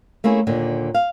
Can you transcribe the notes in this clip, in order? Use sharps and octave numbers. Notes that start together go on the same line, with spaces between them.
A3 A#3 C#4 E4 G#4
D#2 A#2 D3
F5